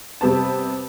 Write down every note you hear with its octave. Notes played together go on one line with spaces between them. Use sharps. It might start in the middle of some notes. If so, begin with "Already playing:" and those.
C3 G3 B3 A5